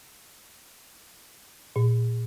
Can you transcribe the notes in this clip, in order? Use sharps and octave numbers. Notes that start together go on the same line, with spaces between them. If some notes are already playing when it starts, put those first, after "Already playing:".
A#2